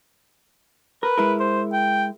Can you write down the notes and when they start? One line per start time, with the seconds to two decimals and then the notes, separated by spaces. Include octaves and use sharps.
1.03 A#4 B4
1.18 G#3 E4 A#4
1.40 C5
1.73 G5